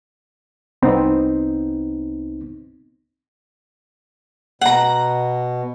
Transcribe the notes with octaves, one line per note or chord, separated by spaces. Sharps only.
C2 B3 C4 D#4
B2 F#5 A#5